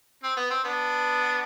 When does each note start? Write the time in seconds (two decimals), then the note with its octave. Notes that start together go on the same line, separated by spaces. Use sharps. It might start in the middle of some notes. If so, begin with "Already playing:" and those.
0.24 C4
0.37 B3
0.51 C4
0.64 B3 D4